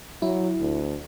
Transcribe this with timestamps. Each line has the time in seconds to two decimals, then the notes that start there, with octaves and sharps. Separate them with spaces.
0.22 F#3 E4
0.60 D2